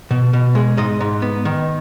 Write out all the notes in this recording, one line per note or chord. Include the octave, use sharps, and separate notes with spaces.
B2
B2
G#3
G#2 D#5
G#2
B3
D#3